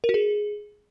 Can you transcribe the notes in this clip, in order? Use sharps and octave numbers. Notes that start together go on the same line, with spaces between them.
A#4
F#4
G#4